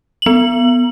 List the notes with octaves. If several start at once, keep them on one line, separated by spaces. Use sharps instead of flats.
B3 F#7